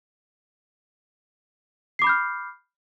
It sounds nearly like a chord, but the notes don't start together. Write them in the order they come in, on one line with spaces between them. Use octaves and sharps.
C7 D6 B5 G6 F6